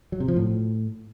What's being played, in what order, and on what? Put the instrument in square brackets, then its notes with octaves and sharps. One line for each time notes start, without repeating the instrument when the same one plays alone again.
[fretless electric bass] F#3
C3
F3
A2